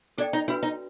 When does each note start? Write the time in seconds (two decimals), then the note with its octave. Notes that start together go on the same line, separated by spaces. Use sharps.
0.18 D4 A4 D5 G5
0.33 D#4
0.48 D4 E4 F#4 B4
0.63 D#4